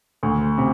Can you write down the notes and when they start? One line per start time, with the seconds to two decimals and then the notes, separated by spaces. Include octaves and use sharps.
0.23 D2
0.58 C3